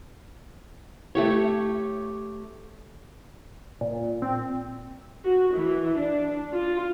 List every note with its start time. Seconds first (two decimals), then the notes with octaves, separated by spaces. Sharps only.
1.15 A3 G4 C#5
3.81 A#2
4.22 C4
5.25 F#4
5.56 E3
5.98 D4
6.54 F4